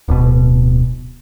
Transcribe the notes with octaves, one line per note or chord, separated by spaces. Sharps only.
D1 B2